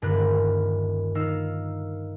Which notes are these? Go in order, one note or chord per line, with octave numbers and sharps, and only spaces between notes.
D#1 G2 D3 A#4 B5 F#6
D#3 D#4 F5 E6